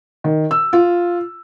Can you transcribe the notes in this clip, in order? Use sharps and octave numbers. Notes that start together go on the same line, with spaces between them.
D#3
E6
F4